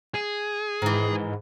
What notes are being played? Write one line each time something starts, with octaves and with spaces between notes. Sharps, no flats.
G#4
G#2 D#3 E3